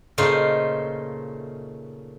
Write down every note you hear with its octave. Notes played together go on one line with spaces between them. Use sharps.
A#2 C#3 A3 D#4 F4 C5